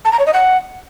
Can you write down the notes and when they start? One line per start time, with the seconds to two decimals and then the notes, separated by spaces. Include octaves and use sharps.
0.05 A5
0.12 A#5
0.19 C#5
0.26 D#5
0.33 F#5